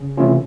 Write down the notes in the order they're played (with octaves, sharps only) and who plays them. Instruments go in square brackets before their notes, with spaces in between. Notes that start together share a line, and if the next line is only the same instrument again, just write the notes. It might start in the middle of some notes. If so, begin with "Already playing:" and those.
Already playing: [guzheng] C#3
[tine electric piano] C3 E3 A3 C#4 F4